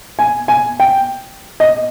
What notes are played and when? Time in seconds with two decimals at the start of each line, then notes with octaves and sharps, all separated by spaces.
0.19 G#5
0.48 G#5
0.80 G5
1.60 D#5